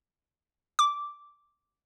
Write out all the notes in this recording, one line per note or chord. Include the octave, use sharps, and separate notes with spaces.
D6